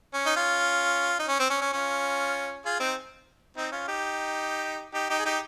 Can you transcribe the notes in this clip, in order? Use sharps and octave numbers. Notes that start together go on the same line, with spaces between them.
C#4
D#4
C#4 F4
D#4
C#4
C4
C#4
C#4
C#4 F4
F4 G#4
C4 D#4
C4 D#4
C#4 F4
D#4 G4
D#4 G4
D#4 G4
G#4
D#4 G4